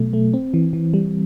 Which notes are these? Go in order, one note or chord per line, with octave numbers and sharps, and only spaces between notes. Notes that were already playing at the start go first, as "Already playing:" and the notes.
Already playing: B2 F#3 A3
A3
C4
E3
E3
G3